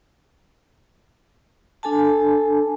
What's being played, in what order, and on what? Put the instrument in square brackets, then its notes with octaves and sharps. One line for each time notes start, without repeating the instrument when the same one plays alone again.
[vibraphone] D4 A4 G#5 A5